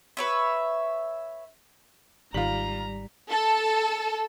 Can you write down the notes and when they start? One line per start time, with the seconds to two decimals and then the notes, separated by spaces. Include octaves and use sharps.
0.17 B4 C#5 E5
2.34 G#1 D#3 G3 F4 A#5 B6 F#7
3.30 A4